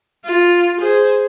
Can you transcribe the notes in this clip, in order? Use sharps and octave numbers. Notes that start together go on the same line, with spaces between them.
F4
G#4 C5